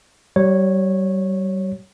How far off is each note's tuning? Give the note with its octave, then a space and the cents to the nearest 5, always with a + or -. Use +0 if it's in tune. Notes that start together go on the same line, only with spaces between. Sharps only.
G3 -35 C#5 -10